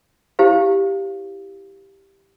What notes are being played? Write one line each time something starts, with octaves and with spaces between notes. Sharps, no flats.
E4 G4 C5 F5